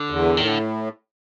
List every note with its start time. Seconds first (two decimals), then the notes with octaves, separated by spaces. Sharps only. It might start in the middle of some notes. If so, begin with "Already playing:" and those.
Already playing: D3
0.10 E2
0.37 A2 D#3
0.48 D3